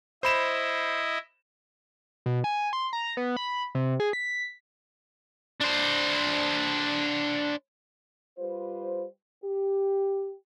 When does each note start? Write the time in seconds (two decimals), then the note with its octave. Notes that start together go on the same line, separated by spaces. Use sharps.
0.23 E4 C5 D#5 B5 E7
2.26 B2
2.44 G#5
2.73 C6
2.93 A#5
3.17 B3
3.37 B5
3.75 C3
4.00 G#4
4.13 B6
5.61 D4 C5
8.38 G3 F4 B4 C5
9.43 G4